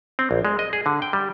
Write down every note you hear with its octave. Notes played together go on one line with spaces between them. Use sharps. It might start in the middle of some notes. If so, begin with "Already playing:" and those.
C4
A#1
G#3
D#5
G#4
D3
G5
G3